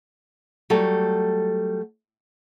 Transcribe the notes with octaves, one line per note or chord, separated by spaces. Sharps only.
F#3 G3 A3 A4